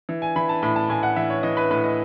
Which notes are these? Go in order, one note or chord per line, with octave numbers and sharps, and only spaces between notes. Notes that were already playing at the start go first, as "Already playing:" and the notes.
E3
G#5
E3 B5
A5
A2 B5
A5
A2 G#5
F#5
E3 E5
C#5
E3 D#5
B4
A2 B4
D#5